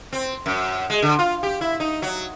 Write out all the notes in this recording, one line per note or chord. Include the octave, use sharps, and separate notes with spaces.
C4
F#2
G#3
D3
F4
G4
E4
D#4
F#3